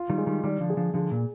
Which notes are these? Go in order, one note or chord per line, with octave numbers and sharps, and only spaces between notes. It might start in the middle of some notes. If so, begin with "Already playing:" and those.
Already playing: F4
D#3 G3
G#3
D#3 G3
D#3 G3 D5
D3 F3
G#4
D3 F3
D3 F3 G#4
A#2